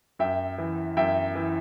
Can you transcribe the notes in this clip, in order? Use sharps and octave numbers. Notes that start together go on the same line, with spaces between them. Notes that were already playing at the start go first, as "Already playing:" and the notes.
F#2 E5 G5
E3
F#2 E5 G5
E3